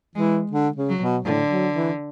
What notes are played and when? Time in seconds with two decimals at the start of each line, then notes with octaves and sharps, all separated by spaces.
0.15 E3 G#3
0.52 D3
0.76 C#3
0.89 F#3
1.00 B2
1.25 A2 D3
1.50 F#3
1.74 E3